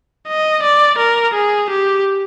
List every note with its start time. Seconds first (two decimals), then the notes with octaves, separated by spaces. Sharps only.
0.28 D#5
0.63 D5
0.98 A#4
1.34 G#4
1.70 G4